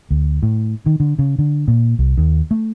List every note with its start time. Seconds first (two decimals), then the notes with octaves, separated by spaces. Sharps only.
0.11 D2
0.43 A2
0.86 D#3
1.00 D3
1.19 C#3
1.39 D3
1.68 A#2
1.99 C2
2.17 D#2
2.51 A3